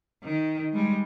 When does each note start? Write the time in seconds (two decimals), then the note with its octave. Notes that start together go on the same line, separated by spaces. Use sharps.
0.23 D#3
0.73 G3 G#3